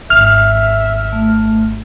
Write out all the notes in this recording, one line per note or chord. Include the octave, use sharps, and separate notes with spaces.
G#1 D3 E5 F6
A3